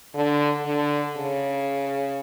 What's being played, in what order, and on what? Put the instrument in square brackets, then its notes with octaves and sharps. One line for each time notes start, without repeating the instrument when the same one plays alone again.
[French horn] D3
D3
C#3